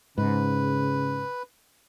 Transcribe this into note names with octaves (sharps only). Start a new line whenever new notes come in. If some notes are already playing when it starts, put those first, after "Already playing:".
G#2 C#3 B4